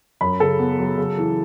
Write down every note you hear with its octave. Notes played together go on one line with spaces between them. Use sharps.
F#2 B5
C#3 A4
B3
F#3
C#3
E3